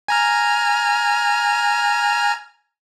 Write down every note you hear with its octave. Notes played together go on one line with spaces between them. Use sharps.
G#5 A#5 F6